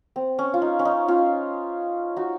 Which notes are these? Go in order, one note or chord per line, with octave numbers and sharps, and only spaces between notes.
C4
C#4
F4
D#4
C#4
D#4
C#4 F4
D#4 F#4